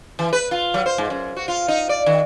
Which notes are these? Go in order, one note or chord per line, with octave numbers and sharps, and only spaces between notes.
E3
B4
F4
F#3
C5
G#2
F#2
F#4
F4
D#4
D5
D#3